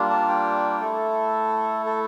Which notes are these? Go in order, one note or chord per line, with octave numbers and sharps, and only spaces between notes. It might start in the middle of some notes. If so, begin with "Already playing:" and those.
Already playing: G3 A#3 D4 F4
A5
G5
A3 E4 A4
A4